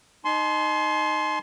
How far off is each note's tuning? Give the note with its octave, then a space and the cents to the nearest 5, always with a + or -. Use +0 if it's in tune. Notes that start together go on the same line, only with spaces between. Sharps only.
D#4 -15 G#5 +45 C6 +0